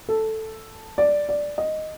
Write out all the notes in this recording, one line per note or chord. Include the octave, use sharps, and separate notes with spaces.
A4
D5
D5
D#5